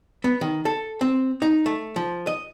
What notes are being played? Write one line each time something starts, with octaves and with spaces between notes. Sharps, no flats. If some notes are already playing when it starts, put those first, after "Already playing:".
B3
D#3
A4
C4
D#4
A3
F3
D#5